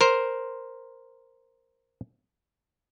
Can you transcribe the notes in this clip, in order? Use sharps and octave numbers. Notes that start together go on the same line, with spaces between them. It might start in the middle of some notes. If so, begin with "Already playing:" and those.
A#4 C5